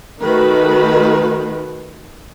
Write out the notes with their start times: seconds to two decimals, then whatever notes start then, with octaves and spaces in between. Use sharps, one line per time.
0.22 D#3 A3 F#4 B4